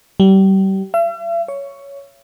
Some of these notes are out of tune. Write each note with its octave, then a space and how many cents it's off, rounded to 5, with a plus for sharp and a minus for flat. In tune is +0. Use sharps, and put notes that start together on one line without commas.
G3 -30
E5 +45
C#5 +10